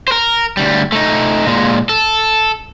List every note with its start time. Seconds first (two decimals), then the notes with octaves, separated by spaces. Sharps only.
0.08 A#4 C5
0.57 D2 G3
0.92 A3 D#4
1.47 A#2 G#3
1.89 A4